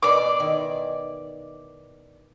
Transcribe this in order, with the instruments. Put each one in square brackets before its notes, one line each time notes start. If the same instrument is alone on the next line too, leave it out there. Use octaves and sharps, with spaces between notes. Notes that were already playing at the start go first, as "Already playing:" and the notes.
[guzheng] B2 G#4 C#5 [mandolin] D5 D6
[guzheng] D#3 E4